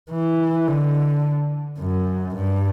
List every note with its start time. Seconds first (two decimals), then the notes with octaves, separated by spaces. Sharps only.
0.11 E3
0.68 D3
1.80 F#2
2.36 G2